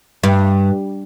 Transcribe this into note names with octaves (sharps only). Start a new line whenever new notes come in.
G2